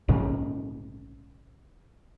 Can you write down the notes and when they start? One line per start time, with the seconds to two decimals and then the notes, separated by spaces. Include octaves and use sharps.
0.08 A#1 G#2 C#3